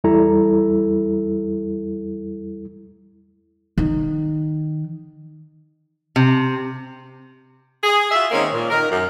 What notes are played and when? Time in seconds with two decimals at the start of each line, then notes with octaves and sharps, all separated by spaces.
0.04 E2 G3 E4 A4 A#5
3.78 D#3
6.16 C3
7.84 G#4
8.11 F4 F#4 E5
8.31 D#3 G#3 A#3 C4 C#4
8.53 A#2
8.70 D#3 A#4
8.91 F#2